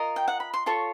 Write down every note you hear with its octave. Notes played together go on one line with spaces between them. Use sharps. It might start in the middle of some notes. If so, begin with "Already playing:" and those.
Already playing: F4 A#4 D#5
G5
F#5
B5
C6
F4 A4 C#5 C#6